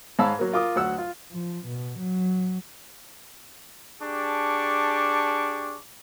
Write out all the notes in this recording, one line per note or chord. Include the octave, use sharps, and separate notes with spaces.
G#2 C#5 F5 A5 B5 E6
F#3 A#3
F4 A#4 D6 D#6
D2 F#3 F#5 E6
F4
F3
B2
F#3
D4 G4 G#4 A5 C#6 D6